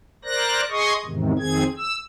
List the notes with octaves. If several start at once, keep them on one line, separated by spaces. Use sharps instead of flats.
A#4 C5 D5 F#6 A#6
G#4 D#5 C6 C#6 D#6
E2 G#2 C3 D#3
F2 D#3 C4 G#4 G#6
E6